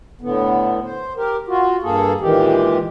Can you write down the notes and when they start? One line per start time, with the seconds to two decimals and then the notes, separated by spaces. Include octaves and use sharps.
0.21 A2 D3 B3
0.83 C5
1.16 G4 A#4
1.48 F4 F#4
1.83 G2 A#3 G#4 A4
2.21 A#2 D#3 E3 G#3 G4